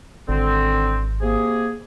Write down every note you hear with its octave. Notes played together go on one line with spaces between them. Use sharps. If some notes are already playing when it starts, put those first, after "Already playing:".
G#1 D3 C4
C3 A#3 G#4